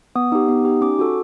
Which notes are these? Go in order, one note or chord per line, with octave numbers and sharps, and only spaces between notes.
B3 D#6
D#4 G4
B3
D#4 G4
C#4 D6
F#4 A4